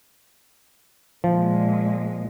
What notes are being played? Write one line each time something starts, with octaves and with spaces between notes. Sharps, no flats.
A#2 F3 G#3